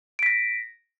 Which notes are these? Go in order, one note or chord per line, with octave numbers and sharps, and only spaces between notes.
A#6 B6 D7